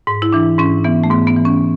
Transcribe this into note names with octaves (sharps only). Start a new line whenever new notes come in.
G#2
E4
E3 D4
G#2 C#4
E3 B3
A3
G#2 B3
B3
E3
C#4